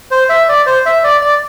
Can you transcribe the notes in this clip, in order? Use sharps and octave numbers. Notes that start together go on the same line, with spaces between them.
C5
E5
D5
C5
E5
D5
D5